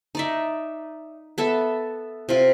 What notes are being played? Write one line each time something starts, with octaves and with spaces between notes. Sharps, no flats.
D#4 D5 E5
B3 A4 E5
C3 F4